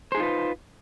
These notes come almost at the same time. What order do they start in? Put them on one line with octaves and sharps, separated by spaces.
C5 G#4 D#4 F4 B4